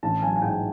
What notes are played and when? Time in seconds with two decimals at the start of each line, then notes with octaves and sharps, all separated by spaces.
0.03 A1 A5
0.22 F#3 G#5
0.36 G#5
0.42 G#2 G5